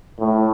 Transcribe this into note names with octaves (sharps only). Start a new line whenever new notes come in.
A2